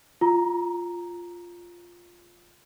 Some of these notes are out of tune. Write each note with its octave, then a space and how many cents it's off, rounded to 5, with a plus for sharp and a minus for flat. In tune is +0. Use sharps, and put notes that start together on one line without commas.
F4 +0 A#5 +0